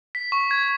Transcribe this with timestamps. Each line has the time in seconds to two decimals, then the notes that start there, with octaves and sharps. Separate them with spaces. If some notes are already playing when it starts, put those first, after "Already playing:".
0.15 B6
0.32 C#6
0.51 G#6